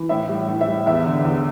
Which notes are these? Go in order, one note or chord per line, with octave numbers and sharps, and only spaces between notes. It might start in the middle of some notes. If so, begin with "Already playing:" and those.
Already playing: E3
A2 E5
G3
A2
E5
G3
E2 E5
D3
E2